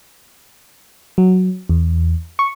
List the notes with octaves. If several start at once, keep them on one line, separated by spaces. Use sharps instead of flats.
F#3
E2
C#6